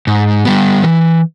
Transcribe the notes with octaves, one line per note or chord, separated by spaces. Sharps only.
G#2
G3 B3
E3